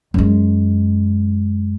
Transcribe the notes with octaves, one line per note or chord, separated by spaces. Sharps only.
F#2 G#3